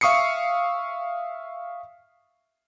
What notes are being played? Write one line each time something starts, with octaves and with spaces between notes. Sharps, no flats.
E5 F5 C#6 D#6 C7 C#7